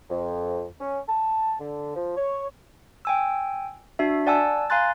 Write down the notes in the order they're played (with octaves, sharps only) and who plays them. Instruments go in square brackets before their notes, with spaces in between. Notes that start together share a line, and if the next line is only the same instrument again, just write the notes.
[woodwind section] F2
C#4
A5
D3
F3
C#5
[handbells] G5 G#5 E6
D4 F#4 E5
D5 F#5 G#5 A5 E6
F5 G#5 A#5 C6 F#6 A6